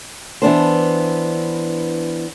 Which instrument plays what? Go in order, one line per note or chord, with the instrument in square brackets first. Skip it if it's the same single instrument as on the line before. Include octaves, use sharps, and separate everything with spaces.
[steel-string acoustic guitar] E3 B3 D4 C5